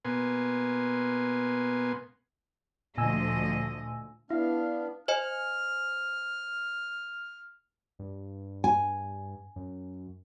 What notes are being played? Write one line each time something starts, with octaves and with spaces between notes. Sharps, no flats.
B2 A#3 B3 G#5 C6
D2 A#2 F3 D#5 G#5 E6
B3 D4 E4 F5
C5 D#5 G#5 F6
G2
G#5
F#2